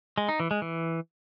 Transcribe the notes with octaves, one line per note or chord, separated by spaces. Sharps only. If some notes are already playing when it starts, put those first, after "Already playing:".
G#3
D#4
E3
G#3
E3